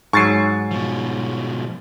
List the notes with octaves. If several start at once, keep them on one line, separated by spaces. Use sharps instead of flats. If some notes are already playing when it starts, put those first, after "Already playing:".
G#2 F#3 C#6 A6 C7
B2 F3